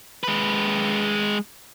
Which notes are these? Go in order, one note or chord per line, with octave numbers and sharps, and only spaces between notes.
G#3 B4